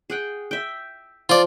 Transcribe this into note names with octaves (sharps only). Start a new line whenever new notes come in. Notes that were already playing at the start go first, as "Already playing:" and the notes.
G#4 F#5 G5
E5 G5
F3 F4 D5 C6